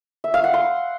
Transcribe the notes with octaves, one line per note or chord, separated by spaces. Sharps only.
E5
F5
F#5
C6